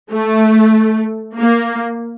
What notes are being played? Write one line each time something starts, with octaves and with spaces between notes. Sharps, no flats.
A3
A#3